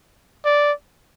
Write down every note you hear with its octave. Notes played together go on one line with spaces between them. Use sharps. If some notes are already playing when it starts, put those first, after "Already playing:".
D5